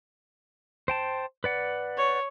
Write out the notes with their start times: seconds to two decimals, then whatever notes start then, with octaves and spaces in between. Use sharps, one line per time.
0.88 C5 G5 A5
1.44 B4 D5 F#5
1.97 C#5